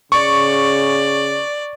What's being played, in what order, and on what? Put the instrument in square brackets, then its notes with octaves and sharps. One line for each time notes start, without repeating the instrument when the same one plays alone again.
[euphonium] C#3 [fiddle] D5 [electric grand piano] C#6